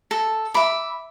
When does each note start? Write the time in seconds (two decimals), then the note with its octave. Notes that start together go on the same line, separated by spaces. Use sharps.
0.11 A4
0.54 E5 B5 D6